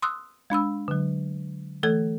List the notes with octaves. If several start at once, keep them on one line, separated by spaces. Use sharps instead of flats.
C6 D#6 E6 F#6
G#3 D4 B5 E6
D3 F#3
E3 A3 A4 G#6